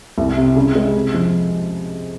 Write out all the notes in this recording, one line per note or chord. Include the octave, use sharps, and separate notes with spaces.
C2
C3
C#3
G#3
C3
F3